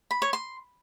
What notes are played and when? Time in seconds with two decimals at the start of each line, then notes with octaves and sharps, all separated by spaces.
0.11 B5
0.22 C#5
0.33 C6